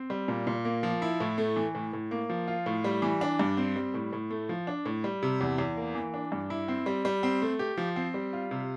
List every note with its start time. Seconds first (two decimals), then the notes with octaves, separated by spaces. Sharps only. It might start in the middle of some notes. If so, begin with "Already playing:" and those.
Already playing: C4
0.10 G3
0.28 A#2
0.47 A#2
0.65 A#3
0.83 F3
1.02 E4
1.20 A2
1.38 A3
1.56 E3
1.75 A2
1.93 A2
2.11 A#3
2.30 F3
2.48 F4
2.66 A2
2.84 G3
3.02 E3
3.21 D4
3.39 G2
3.57 C4
3.76 G3
3.94 A2
4.13 A2
4.31 A3
4.49 F3
4.67 D4
4.86 A2
5.04 G3
5.23 C3
5.41 E2
5.58 E2
5.77 A#3
5.95 E3
6.14 D4
6.32 G2
6.50 E4
6.68 C4
6.86 G3
7.05 G3
7.23 C4
7.42 A3
7.59 G4
7.77 F3
7.96 C4
8.14 G3
8.33 F4
8.51 C3